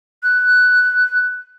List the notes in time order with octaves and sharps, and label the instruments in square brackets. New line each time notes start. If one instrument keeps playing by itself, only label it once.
[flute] F#6